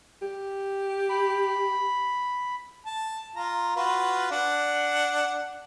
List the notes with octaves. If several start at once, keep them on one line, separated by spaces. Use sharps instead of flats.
G4
B5
A5
F4 A#5
F4 F#4 B4
D4 F#5